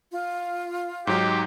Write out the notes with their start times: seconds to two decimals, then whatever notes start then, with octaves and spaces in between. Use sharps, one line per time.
0.11 F4
1.07 G#2 F#3 D#4 G4